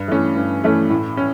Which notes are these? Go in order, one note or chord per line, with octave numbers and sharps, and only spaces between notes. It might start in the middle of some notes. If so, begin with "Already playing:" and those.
Already playing: G2
E3 A3 C#4
G2
E3 A3 C#4
A2
C#4